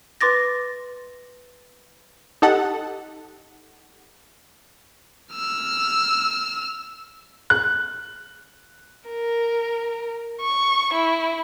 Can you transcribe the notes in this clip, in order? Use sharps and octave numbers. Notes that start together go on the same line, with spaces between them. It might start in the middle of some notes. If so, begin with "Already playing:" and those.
B4 C6 D6 A6 A#6
D#4 G4 A4 F#5
E6 F6
F#6
A#4
C#6
E4